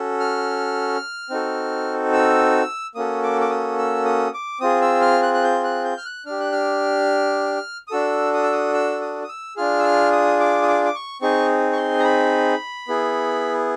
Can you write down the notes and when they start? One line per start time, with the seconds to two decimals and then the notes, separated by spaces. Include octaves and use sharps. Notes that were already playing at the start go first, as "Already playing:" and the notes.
Already playing: C#4 F#4 A4
0.20 F6
1.30 C4 D#4 F#4 A4
2.13 E6
2.95 A#3 C#4 F#4 A4 D#6
3.23 D6
3.41 D6
3.50 D#6
3.78 E6
4.05 D#6
4.34 D6
4.60 C4 F4 G#4 D#6
4.82 E6
5.02 F6
5.22 F#6
5.34 F#6
5.44 G6
5.64 F#6
5.85 G6
5.97 F6
6.05 F#6
6.26 D4 G4 F6
6.40 F#6
6.52 F6
7.88 D#6
7.91 D4 F#4 A4 E6
8.34 D#6
8.43 E6
8.53 D#6
8.74 E6
9.01 D#6
9.24 D#6
9.29 E6
9.56 D4 F4 G#4 F6
9.80 E6
9.84 F6
10.12 D#6
10.40 D6
10.62 D#6
10.68 D6
10.85 D6
10.95 C#6
11.22 C4 D#4 G#4 C#6
11.72 C#6
11.77 C6
11.99 A#5
12.04 B5
12.88 B3 E4 G#4